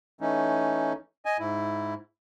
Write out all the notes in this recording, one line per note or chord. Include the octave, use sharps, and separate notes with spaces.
E3 A3 C#4 D#4
D#5 G#5
G#2 E4